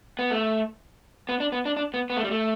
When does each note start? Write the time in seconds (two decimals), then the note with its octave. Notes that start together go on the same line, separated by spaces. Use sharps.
0.19 B3
0.30 A3
1.29 B3
1.40 D4
1.52 B3
1.65 D4
1.77 D4
1.94 B3
2.10 B3
2.17 A3
2.24 G3
2.31 A3